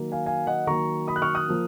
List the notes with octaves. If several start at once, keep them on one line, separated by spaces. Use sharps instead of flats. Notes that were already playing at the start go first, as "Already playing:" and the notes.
Already playing: D#3 F#3 A#3
F5 G#5
F5 G#5
D#5 F#5
D#3 F#3 A#3 A#5 C#6
B5 D#6
F#6
C#6 F6
D#6 F#6
F3 A#3